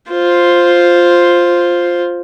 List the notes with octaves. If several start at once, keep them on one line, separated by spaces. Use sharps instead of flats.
F4 C5